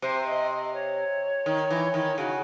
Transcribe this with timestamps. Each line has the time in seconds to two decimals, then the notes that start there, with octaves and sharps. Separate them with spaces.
0.02 C3 C5
0.26 D#5
0.51 D#5
0.74 C#5
1.46 D#3
1.70 E3
1.94 D#3
2.18 C#3 F#4